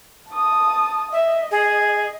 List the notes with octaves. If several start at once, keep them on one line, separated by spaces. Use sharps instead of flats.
A5 D#6
D#5 E5
G#4